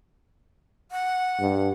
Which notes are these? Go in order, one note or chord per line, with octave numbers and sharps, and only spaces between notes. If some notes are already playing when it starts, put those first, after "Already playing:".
F#5
G2